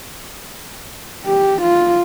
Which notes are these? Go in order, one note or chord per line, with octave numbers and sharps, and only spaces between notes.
G4
F4